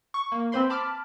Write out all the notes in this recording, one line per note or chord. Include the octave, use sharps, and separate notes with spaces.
C#6
A#3
C4 B4 C5 B5 C6
A5 B5 D6 F6